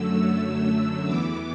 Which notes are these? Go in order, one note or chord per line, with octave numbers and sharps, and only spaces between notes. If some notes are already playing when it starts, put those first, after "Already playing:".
Already playing: F#2 D3 F#3 A3 E6
E2 E3 B3 D6